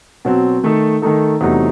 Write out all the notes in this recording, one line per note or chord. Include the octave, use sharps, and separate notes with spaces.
B2 F#3 C4
D#3 A3 D#4 A4
D#3 A3 D#4 A4
E2 C3 F#3 A3 D#4